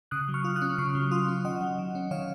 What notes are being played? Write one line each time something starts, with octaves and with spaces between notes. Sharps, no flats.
C#3 D#6 F#6
F#3
C#6 F6
F4
D#6 F#6
C#4
C#3 C#6 F6
F#3
F4 C6 D#6
C#4
D#3 D#5 F#5
F#3
D#3
C#4
D#3 C#5 F5